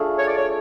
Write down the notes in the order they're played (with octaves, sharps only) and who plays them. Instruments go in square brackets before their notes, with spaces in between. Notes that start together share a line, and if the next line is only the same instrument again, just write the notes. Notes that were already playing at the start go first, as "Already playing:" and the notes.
Already playing: [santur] F3 A3 D4 F4 G#4
[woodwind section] C#5
D5
C#5